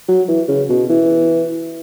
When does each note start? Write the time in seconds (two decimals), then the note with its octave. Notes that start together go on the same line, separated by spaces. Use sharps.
0.08 F#3
0.28 E3
0.48 C#3
0.69 B2
0.90 E3